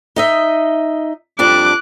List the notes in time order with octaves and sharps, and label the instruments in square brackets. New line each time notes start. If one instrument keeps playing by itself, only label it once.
[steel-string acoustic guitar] D#4 D#5 E5
[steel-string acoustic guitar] F2 G3 D4 [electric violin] D6 F#6